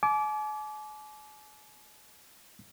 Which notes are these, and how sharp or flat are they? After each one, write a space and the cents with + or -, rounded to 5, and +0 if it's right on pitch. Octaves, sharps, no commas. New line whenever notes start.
G#5 +45 D6 -15